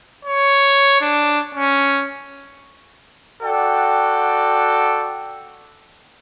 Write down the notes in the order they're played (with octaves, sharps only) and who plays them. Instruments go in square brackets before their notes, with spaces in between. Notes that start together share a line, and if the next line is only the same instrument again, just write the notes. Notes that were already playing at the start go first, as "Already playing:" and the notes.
[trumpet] C#5
D4
C#4
[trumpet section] F#4 A4 D5 F#5 G5